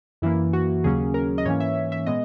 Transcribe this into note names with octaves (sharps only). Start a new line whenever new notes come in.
F#2 E3 A#3 E4
F#4
D#2 C#3 F#3 A#3 C#4 G#4
A#4
D#5
G#2 E3 A#3 C#4 C#5
E5
E5
A#2 G#3 B3 D#5